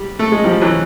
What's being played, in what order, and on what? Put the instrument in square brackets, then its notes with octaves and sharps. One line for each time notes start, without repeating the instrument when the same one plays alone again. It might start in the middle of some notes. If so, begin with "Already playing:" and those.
Already playing: [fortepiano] G3
A3
G#3
F3 G3
E3 F#3